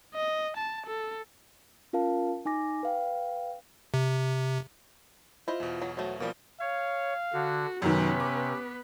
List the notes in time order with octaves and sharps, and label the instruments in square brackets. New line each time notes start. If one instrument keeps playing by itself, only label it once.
[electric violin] D#5
A5
A4
[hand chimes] C#4 F4 A#4 F5 A5
D#4 G#5 D6 A#6
B4 F5 G5
[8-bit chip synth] C3
[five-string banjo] E4 C5 D#5 [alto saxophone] F4
[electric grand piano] E2 B2
[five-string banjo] F#3
[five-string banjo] F3 A3 [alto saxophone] F#3
[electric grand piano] B2 F3 [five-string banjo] G3 C#4 [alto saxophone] A#3
[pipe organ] C#5 [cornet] F5
[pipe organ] D3 [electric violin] F#4
[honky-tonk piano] F#2 D#3 [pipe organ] C3 [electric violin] B3 B4 [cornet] C#4
[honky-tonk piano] D6